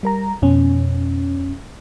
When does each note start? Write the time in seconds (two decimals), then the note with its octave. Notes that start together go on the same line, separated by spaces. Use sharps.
0.03 G3 A#4 A#5
0.42 F2 B2 C#4